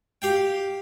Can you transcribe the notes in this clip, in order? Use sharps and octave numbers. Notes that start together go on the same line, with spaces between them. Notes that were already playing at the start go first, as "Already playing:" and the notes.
G4 F5 G5